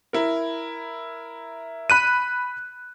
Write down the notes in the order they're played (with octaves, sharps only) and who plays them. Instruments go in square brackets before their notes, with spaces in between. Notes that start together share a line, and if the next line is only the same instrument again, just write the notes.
[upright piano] E4 A#4
[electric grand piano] B5 F#6 D#7